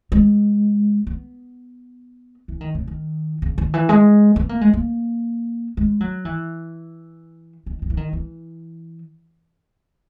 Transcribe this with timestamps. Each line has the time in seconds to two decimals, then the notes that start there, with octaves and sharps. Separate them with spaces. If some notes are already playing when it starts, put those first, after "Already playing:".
0.12 G#3
1.07 B3
2.48 E3
2.61 D#3
2.75 C#3
2.87 D#3
3.42 C#3
3.58 D#3
3.74 E3
3.89 G#3
4.36 B3
4.49 A#3
4.61 G#3
4.73 A#3
5.77 G#3
6.00 F#3
6.25 E3
7.66 D#3
7.82 D#3
7.90 E3
7.97 D#3
8.13 E3